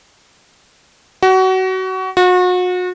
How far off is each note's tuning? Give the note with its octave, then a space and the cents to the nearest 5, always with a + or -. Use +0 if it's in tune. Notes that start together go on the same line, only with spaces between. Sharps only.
F#4 +25
F#4 -35